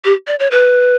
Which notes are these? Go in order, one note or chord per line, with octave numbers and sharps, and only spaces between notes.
G4
D5
C#5
B4